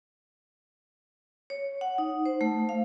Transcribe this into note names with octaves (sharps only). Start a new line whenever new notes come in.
C#5
F#5
D#4
C5
A3
F5